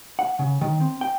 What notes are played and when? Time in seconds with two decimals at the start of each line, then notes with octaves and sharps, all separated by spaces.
0.19 F#5
0.39 C#3
0.61 D#3
0.81 C4
1.01 G5